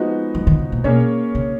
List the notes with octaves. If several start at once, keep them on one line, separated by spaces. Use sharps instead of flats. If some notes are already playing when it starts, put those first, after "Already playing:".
Already playing: F3 G#3 B3 D#4 F#4
F3
D#3
C#3
A#2
B2 A#3 C#4 G#4 C#5
C#3